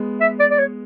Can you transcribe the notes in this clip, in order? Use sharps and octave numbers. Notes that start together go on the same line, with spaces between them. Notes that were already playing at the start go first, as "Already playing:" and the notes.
Already playing: G#3 B3
E5
D5
D5
C#5